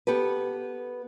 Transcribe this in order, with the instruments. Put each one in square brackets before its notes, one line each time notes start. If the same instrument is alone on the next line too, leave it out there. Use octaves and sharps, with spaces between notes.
[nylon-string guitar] B3 G4 A4 B4